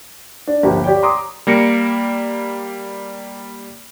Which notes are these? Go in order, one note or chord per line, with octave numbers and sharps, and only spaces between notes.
D4
G1 D2 E3 F3 A#3 G4
G4 C#5 D5 G5
A#5 C6 D6 D#6
G3 A#3 A#6 C#7 D7